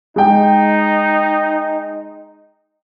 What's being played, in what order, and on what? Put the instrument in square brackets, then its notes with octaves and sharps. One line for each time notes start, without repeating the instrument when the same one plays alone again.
[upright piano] G#3 G5 [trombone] D#4